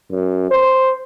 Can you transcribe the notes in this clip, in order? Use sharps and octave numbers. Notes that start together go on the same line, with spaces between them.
F#2
C5